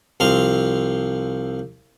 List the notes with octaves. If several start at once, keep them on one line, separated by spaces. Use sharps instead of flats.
C2 F3 C4 F5